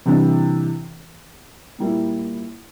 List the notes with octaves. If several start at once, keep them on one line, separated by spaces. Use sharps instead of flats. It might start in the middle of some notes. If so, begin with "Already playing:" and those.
C3 E3 G3 D4
A#2 G3 A#3 E4